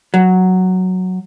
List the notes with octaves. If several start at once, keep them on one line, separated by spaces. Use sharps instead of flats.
F#3